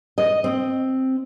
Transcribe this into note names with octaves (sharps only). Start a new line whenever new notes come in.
D#5
C4